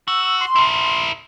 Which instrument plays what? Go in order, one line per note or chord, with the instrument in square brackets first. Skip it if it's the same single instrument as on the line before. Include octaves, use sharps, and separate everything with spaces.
[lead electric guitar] F#4 [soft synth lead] E6
[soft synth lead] C6
[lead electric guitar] E4 A#4